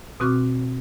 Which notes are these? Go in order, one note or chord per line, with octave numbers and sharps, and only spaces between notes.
B2 C4 F#4 C#6 D6 F6